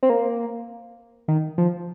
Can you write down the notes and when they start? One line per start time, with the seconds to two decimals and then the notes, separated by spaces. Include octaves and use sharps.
0.03 C4
0.10 A#3
1.28 D#3
1.58 F3